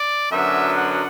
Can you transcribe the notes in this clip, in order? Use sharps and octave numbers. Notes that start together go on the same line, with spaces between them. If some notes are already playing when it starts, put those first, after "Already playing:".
Already playing: D5
F#2 D3 F#3 B3 D4 E5
F#5